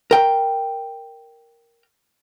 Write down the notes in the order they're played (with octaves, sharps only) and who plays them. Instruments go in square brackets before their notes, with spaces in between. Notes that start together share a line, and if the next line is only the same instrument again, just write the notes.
[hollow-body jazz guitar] A#4 G5